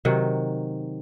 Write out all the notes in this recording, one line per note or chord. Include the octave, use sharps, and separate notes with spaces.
C3 D#3 F#3